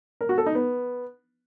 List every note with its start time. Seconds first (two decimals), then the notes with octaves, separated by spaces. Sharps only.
0.21 A#4
0.29 F#4
0.38 A4
0.46 D#4
0.55 B3